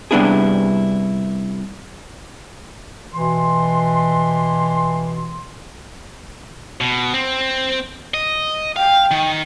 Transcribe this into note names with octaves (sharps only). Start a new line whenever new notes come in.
C3 G3 B3 D4 E4 G#4
B2 E3 C6
B2
C4
D#5
F5 G5
D#3